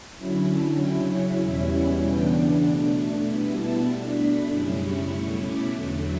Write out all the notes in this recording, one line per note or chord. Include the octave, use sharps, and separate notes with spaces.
D3 F#3 C#4 E4 B5
A5
C#3 F#3 C#4 E4 G5
F#5
E2 B2 G3 C#4 E4 E5
F#5
C#3 E3 B3 D4 G5
B2 A3 D4 D6
C#6
B2 G3 B3 E4 B5
A5
B2 A3 D4
B5
F#2 C#3 G3 C#4 E4
C#6
B2 A3 C#4 E4 C#6
D6
E2 D3 F#3 A3